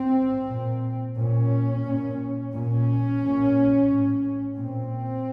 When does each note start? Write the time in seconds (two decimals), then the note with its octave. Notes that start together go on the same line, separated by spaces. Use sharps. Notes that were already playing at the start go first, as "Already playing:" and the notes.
Already playing: C4
0.49 A#2
1.18 A#2 C#4
1.85 A#2
2.53 A#2 C#4
3.21 A#2
3.90 A2
4.56 A#2 C4